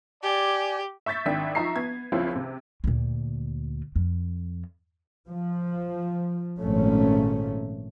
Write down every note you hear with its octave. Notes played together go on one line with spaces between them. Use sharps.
G4 D5 G#5
E5 C#6 G6 A6 B6
G#1 D#3 D4 E5 G5 B6
F3 D#4 E5 A#5 C#6 C7
B3 G#6
C#2 F3 C4 C#4 E4 F5
C3
D2 A#2
F2
F3
G#1 A#2 F3 A3 C#4